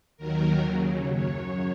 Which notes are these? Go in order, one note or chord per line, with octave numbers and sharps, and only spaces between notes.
D#2 D#3 F#3 A#4
D#2 C#3 F#3
F#2 F#3 C#5